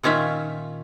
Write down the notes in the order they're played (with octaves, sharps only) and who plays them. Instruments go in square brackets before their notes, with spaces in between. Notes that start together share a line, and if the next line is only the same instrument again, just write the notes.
[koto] A#2 D#3 C#4 F4 E5